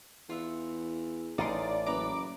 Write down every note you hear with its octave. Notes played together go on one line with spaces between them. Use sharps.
E2 F4 E5 F#5
A1 D#4 D5 D#5 C6
F#1 B4 A#5 D6